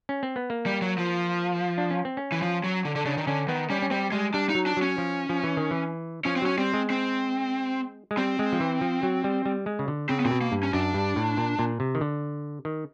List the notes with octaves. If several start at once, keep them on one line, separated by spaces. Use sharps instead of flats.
C#4
C4
B3
A#3
G3
F#3
F3
D4
C#4
C4
C#4
E3
F3
F#3
D3
D3
C#3 D4
D#3
D3 C#4
D#3 B3
G3 C#4
C#4
G3 C4
G3 G#3
G3 D4
D#4
F#3
D4
F#3
C#4
F3
F3
E3
D#3
E3
F3 C#4
C4
F#3 C#4
G3 C4
G#3
C4
G#3
G3 C4
G#3
F3
E3
F3
F#3
G3
G3
G#3
C#3
D3
C#3 C4
B3
A#2 C4
B2
A#3
G2
C#4
F#2 D4
G2
A2
A#2
A#2
C3
D#3
D3
D#3